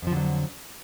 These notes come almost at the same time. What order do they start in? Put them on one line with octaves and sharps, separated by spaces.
F2 F3 D3 F#3